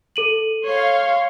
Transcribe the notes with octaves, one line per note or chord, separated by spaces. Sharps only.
A4 D#7 F#7
C#5 F5 C6